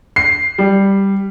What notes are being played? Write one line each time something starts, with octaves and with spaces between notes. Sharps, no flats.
C7
G3